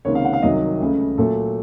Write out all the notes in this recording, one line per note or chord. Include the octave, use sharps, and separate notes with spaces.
C#2 C3 D#3 A#3 C#5
F5
F#5
F5
C2 C3 D#3 F#3 D#5
C#2 C#3 A3
A#2 F#3 A3 A4